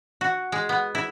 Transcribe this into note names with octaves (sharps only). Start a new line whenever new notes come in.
F#4
G#3
B3
E4